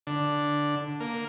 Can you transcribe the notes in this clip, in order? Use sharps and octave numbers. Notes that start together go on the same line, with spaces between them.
D3
A#3